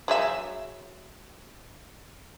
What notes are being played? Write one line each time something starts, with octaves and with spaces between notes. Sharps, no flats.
F#3 G#4 E5